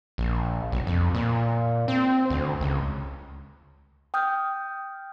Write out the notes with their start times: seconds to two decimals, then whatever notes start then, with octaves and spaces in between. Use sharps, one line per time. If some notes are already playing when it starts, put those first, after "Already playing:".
0.18 A#1
0.72 B1
0.87 F2
1.15 A#2
1.88 C4
2.30 D2
2.61 C#2
4.14 G5 D#6 F6 G6